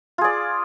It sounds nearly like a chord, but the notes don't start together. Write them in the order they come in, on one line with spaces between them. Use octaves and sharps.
F4 G#4 D5